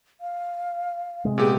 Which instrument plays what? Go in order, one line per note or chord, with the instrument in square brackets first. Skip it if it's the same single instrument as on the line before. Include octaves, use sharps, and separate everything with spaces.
[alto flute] F5
[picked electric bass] C3 G#3
[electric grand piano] A#2 B3 G4 [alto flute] G#4